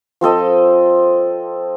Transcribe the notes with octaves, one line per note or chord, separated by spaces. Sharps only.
F3 C4 A4 D#5